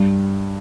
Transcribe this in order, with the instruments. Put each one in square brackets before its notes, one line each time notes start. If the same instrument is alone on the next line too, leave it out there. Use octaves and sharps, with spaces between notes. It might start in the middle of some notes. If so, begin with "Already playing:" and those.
Already playing: [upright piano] G2